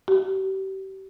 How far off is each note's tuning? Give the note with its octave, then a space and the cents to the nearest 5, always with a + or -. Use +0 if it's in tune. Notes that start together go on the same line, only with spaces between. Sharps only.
G4 -35